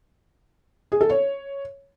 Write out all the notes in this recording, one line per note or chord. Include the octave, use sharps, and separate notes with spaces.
G#4
A4
C#5